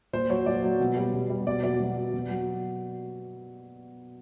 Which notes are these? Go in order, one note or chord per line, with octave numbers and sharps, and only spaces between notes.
A#2 C5
F#3 C#5
A#2 D5
F#3
B2
G3
B2
G3
B2 D5
F#3 D5
B2
F#3
B2
F#3